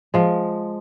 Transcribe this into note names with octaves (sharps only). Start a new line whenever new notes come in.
F3 G#3